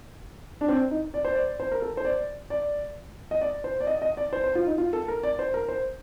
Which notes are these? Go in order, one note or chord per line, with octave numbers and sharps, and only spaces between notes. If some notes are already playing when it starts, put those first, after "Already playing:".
D4
C4
D#4
D5
C5
D5
C5
A#4
A4
C5
D5
D5
D#5
D5
C5
D5
D#5
D#5
D5
C5
C5
F4
D#4
F4
A4
A#4
D5
C5
A#4
C5